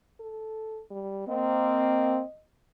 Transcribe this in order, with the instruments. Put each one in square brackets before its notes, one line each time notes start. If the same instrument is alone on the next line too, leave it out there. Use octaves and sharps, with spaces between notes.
[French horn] A4
G3
[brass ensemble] A#3 C4 [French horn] D#5